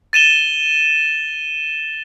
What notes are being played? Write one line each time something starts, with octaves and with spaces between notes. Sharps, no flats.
A6 D#7 E7 G7